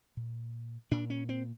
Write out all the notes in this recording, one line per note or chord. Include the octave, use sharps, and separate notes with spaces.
A#2
A#2 D4
C#4
C4